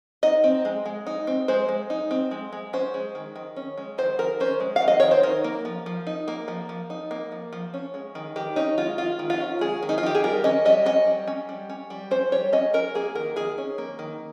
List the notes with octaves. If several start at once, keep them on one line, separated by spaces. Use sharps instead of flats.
D#4 D#5
C4
G#3
G#3
D#4
C4
G#3 C5
G#3
D#4
C4
G#3
G#3
C#4 C5
G#3
D#3
D#3
C#4
G#3
D#3 C5
D#3 A#4
C#4 C5
G#3
F5
D#3
D#5
D#3 C#5
C5
D#4 A#4
A#3
F3
F3
D#4
A#3
F3
F3
D#4
A#3
F3
F3
C#4
G#3
D#3
D#3 G4
C#4 D#4
G#3 F4
D#3 F4
D#3
F4
C#4
G#3 G#4
D#3
D#4
F4
D#3 G4
G#4
G3 A#4
C#4 D#5
G3 D#5
C#4 D#5
G3
C#4
G3
C#4
G3
C#4 C5
G3 C#5
C#4 D#5
C#4 A#4
A#3 G#4
D#3 A#4
D#3 G#4
C#4
A#3
D#3